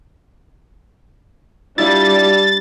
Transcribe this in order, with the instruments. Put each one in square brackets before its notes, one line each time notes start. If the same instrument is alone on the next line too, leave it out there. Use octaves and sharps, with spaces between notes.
[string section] G3 [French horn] D4 [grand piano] E4 F4 D5 [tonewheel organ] A6